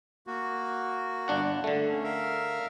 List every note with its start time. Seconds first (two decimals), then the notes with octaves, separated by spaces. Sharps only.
0.27 A#3 F#4
1.28 G1 D4 F#5
1.64 D3 A3
1.91 C#4
2.03 A#4 E5 F5